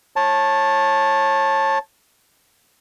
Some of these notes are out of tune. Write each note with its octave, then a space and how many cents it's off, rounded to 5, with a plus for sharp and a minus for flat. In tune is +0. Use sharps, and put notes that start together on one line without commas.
C#5 -25 A5 +0